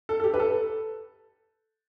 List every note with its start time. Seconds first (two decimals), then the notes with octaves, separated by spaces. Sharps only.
0.09 A4
0.20 A4
0.24 G4
0.34 B4
0.40 A4